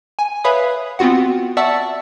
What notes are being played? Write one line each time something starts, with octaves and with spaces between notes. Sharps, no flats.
G#5
B4 C#5 E5 F5 B5 D#6
B3 C4 F4 F#4 F#5
D5 E5 F#5 A5 C#6 E6